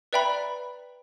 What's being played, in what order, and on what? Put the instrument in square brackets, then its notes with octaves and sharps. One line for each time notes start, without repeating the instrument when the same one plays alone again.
[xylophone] B4 D5 E5 G5 A#5 B5